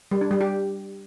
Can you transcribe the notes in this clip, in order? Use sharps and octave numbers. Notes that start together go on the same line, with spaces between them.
G3
D4
G3
G4